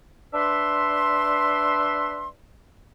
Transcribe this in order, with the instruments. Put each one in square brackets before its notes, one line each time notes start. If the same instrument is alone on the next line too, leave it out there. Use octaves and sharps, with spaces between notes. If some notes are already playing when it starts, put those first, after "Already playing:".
[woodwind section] D4 B4 E5 C6